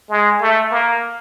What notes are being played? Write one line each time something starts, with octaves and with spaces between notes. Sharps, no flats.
G#3
A3
A#3